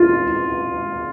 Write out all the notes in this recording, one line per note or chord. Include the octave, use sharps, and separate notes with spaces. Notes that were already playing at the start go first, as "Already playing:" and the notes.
Already playing: F4